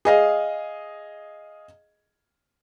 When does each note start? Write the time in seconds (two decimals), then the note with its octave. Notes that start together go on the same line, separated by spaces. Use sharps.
0.05 G#4 D#5 F5